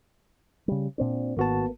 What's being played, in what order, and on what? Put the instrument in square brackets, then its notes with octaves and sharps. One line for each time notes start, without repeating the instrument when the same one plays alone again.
[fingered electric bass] C#3 G3
A#2 C4 D4
[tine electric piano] G#1 F#4 A5 [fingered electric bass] A#3 B3